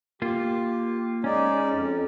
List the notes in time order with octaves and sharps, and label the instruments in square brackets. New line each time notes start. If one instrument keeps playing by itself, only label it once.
[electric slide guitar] A#3 F4 [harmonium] G4
[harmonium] G#3 D#4 D5 [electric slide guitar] C#4
[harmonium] F2